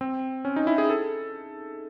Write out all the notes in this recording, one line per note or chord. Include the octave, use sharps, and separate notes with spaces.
C4
C#4
D#4
E4
G#4
A4